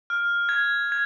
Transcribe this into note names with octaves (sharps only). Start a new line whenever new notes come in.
F6
G#6
G#6